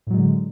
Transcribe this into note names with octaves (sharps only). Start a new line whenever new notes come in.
A2 D3 F#3 G#3